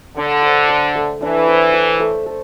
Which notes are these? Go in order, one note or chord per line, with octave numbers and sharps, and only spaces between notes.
D3 D4
C5
E5
A3
E3 D4
C5
E5
A3
A4